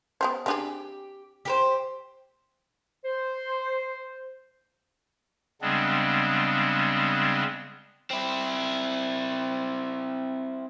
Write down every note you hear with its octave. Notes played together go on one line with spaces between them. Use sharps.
B3 G4 C5
C4 D4 G4 G#4
G4 A#4 C5
C5
C#3 G3 G#3 B3 C4 D4
C4 E4